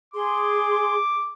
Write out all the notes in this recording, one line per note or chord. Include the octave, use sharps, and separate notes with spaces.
G#4 C6 D6